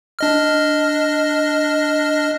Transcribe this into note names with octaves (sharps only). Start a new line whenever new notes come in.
D4 D#5 F6